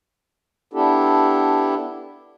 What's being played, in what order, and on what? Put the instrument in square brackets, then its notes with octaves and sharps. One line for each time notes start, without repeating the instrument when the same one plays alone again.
[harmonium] B3 D4 E4 G4 A4